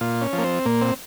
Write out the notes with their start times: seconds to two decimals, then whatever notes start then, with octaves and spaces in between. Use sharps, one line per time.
0.01 A#2 F4
0.21 C#4
0.33 F3
0.38 A#3
0.44 C4
0.65 A#2 A#3
0.81 C4